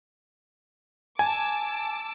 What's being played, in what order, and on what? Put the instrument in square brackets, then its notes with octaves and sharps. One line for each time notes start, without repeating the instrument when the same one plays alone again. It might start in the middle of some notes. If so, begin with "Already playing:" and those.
[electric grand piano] G#5 [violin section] A5 D6 E6